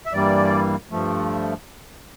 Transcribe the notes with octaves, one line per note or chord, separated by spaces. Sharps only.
E5
G2 E3 G3 A#3 D5
G2 F3 A3